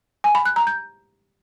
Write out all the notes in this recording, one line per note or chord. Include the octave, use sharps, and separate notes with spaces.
G#5
B5
F#6
A#5
G6